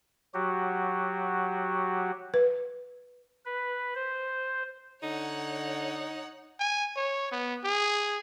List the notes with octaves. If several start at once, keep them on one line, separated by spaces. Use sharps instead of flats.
F#3 F#4 G4
B4
B4
C5
D3 D#4 C#5 F#5
G#5
C#5
B3
G#4